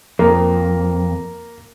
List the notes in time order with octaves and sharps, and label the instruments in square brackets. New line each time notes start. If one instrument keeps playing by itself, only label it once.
[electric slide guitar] F2 [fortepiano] A#3